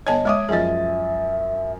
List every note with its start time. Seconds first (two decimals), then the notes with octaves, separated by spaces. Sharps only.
0.07 G1 C#5 D#5 G#5 A5 G#6
0.25 G#3 C#5 E5 D6 D#6
0.49 F#2 F3 G#4 D#5 E5 A6